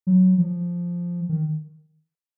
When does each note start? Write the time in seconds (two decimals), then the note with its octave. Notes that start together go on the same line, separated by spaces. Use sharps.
0.07 F#3
0.38 F3
1.29 D#3